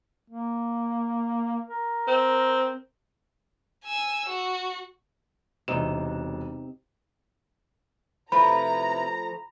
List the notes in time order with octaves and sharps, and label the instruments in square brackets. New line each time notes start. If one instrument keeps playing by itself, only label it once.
[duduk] A#3
A#4
[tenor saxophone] C4
[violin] G#5 E6
F#4
[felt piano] E1 D4 E7 [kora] C3 D#4 D#5
[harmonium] C3 E4 B4 [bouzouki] F3 A3 [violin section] A#5 [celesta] B5